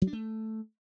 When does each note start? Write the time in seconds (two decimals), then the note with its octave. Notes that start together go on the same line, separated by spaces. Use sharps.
0.02 F#3
0.07 D4
0.13 A3